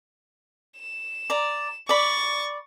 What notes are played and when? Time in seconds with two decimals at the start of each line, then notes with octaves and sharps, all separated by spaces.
0.79 E7
1.30 D5 A#5
1.89 D5 B5 C#6 A6